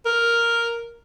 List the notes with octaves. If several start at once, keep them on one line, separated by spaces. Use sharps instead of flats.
A#4